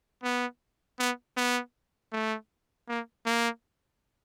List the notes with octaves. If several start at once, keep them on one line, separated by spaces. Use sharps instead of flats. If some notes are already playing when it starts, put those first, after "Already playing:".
B3
B3
B3
A3
A#3
A#3